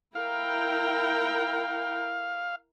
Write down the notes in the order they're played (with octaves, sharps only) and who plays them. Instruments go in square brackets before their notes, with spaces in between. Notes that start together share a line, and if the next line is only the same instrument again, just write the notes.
[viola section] E4 A#4 G5 [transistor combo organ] F5